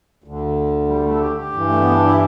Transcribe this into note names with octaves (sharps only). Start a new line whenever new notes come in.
D2 D3
G3
A3
A4
G4
G4
G2 E3
A3
B3
D4
E4